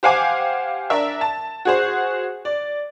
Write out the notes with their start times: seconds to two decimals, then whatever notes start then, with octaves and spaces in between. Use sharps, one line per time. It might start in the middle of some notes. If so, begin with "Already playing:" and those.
0.03 G4 C5 F5 F#5 G#5 D6
0.90 D4 A#4 E5
1.21 A5
1.65 F#4 G#4 C5
2.45 D5